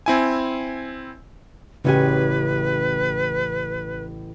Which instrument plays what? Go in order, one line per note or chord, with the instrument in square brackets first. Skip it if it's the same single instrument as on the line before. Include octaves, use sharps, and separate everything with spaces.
[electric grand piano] C4 E4 G#5
[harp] A1 C#4 G#5 [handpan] C#3 F#4 G4 [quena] B4